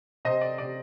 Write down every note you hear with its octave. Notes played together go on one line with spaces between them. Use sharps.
C3 C5 D#5
D5
C3 D5